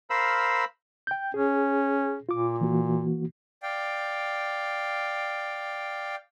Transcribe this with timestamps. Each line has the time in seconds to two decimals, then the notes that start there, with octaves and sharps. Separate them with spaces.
0.10 A#4 C5 F5 B5 E6
1.07 G5 G6
1.34 C#4 G#4
2.29 A#2 F4 D6
2.61 E3 A#3 F#4
3.63 D5 F5 G5